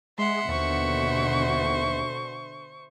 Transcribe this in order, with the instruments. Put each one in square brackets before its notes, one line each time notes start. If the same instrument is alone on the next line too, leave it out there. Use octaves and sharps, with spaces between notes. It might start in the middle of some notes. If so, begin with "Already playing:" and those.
[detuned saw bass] G#3 [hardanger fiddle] E5 F#5 [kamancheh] C6
[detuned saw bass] D#2 [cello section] B2 D3 [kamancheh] C5 C#6